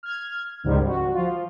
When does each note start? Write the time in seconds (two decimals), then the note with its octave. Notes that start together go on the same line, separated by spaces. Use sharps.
0.03 F6 G#6
0.64 C#2 G#2 D#3 F3 G3
0.87 F#4
1.14 F3 F4